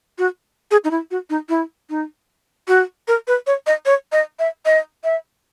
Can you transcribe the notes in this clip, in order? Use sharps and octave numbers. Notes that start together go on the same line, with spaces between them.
F#4
G#4
D#4
E4
F#4
D#4
E4
D#4
F#4
A#4
B4
C#5
D#5
C#5
D#5
E5
D#5
E5